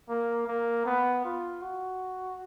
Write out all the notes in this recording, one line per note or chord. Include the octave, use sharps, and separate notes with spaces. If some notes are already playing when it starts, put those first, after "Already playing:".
A#3
A#3
B3
F4
F#4